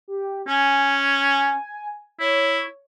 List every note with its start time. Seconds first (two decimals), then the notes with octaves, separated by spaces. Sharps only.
0.08 G4
0.48 C#4 G#5
2.20 E4 C#5